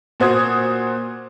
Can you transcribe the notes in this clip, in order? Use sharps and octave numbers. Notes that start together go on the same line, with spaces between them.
A#2 F#4 C5 D#6 G#6